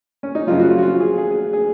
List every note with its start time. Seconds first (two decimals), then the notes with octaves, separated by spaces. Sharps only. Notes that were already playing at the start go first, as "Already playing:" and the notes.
0.23 C#4
0.35 D#4
0.47 F#2 C#3 F3 F4
0.60 F#4
0.71 F4
0.78 F#4
0.83 F4
1.00 G#4
1.18 G#4
1.31 G#4
1.53 G#4